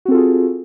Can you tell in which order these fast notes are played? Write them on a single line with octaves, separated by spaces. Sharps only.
F#4 C4 A4 F4 G#4